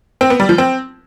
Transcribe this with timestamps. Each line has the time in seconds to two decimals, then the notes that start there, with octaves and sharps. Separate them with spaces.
0.21 C4
0.30 B3
0.40 G3
0.49 F3
0.58 C4